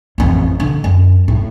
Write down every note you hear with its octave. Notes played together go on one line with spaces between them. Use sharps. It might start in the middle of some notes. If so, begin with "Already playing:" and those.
A1 F2
D3
F#2
A2